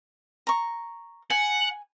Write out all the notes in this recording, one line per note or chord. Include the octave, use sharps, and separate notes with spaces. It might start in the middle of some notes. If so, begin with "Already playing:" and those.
A#5 C#6
F#5 G#5